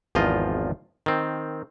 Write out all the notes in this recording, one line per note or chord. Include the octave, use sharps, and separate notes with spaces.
G#1 E2 F3 F4 D#5
D#3 C4